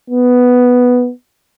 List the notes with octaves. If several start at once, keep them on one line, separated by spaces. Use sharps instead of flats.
B3